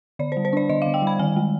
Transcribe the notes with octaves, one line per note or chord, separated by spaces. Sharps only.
D3 D5
C5
G3
C5
D4 D5
D3 D#5
D3 F5
G5
G3 B5
D#3 G#5
G#3